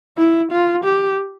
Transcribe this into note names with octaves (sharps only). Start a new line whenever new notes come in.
E4
F4
G4